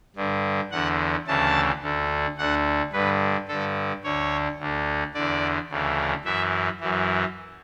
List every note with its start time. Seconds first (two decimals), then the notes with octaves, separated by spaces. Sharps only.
0.16 G2 D3
0.71 E2 D3 F#5
1.27 D2 C#3 E3 A5
1.82 D2 D3
2.38 D2 D3 F#5
2.93 G2 D3 B4
3.48 G2 D3 A4
4.04 D2 D3 C#5
4.59 D2 D3
5.14 E2 D3 D5
5.70 D2 C#3 E3
6.25 F#2 E3 E5
6.80 F#2 E3